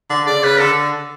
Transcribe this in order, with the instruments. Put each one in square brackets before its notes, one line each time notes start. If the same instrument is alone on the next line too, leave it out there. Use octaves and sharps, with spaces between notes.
[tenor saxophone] D3
[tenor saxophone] C#3 [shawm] D5
[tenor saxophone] C#3 [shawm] B4
[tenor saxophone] D3 [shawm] A4